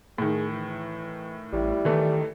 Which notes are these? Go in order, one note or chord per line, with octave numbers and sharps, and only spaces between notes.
A2 D#3 G#4
E3
A1 G3 E4
D#3 E3 A3